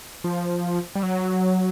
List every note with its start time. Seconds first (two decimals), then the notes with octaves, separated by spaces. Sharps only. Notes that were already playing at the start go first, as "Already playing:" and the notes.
0.24 F3
0.95 G3
1.03 F#3